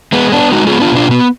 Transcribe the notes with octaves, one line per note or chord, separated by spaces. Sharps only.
G#3 B3
B3 D4
G#3 D#4 F#4
B3 F4 G#4
D4 F4
B2 D4 F4
B3